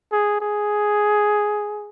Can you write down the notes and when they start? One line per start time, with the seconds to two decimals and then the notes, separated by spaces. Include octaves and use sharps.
0.12 G#4
0.41 G#4